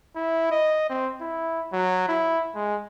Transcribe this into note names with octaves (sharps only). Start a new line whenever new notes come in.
E4
D#5
C4
E4
F#3
E4
G#3